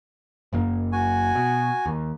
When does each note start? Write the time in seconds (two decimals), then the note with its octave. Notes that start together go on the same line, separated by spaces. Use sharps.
0.53 F#1 F#2 A#3
0.92 F#4 G#5
1.35 B2
1.86 D#2